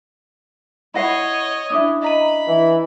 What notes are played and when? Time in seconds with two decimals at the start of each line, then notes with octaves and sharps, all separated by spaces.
0.94 E4 C#5 D#5 F#5 B5 A#6 C7
1.70 C#4 D4 E4 E5 D6 D#6
2.02 D#5 A#5 B5 D#7
2.47 E3